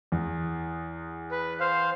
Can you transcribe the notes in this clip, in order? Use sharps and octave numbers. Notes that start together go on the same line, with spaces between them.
E2
B4
C5 F5